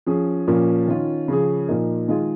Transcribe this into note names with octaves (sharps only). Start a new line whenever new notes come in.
F3 C#4 G#4
A#2 F3 A#3 C#4
D#3 C#4 F4
C#3 F3 C#4 G#4
A#2 F3 A#3 D#4
D#3 G#3 F4 G#4